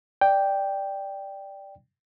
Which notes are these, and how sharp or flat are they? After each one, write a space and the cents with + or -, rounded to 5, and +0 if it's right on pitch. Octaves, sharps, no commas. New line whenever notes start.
D5 +0 G5 +0